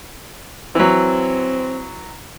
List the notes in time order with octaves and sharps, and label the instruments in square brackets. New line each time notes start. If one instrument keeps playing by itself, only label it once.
[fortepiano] E3 F#3 [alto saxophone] C4